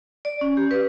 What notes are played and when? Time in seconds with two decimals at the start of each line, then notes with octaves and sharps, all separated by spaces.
0.25 D5
0.41 C#4
0.57 G4
0.71 B4